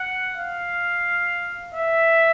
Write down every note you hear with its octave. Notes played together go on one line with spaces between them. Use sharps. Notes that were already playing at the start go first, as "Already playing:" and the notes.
Already playing: F#5
F5
E5